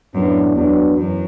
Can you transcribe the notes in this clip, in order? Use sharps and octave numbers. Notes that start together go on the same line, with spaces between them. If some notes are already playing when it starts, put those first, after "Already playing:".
F#2 A2 E3 B3 D4
E2 F#3 B3 D4
F#2 E3